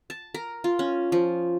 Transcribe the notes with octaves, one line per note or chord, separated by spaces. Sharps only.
A5
A#4
F4
C#4
F3